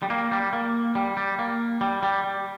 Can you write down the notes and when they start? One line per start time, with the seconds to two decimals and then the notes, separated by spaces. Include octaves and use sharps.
0.02 G3
0.10 A#3
0.31 G3
0.53 A#3
0.95 G3
1.17 G3
1.39 A#3
1.81 G3
2.03 G3
2.24 G3